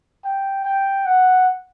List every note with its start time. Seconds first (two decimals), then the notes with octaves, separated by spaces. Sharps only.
0.24 G5
0.64 G5
1.05 F#5